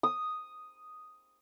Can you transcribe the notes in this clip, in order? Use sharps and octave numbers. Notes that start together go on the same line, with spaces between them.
D#6